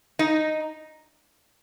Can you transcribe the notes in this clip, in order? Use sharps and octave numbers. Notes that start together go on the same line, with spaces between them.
D#4